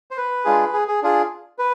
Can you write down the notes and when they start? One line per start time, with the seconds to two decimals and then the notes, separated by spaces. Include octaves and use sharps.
0.11 C5
0.17 B4
0.45 G#3 D4 F4 G#4
0.73 G#4
0.88 G#4
1.02 D4 F4 G#4
1.59 B4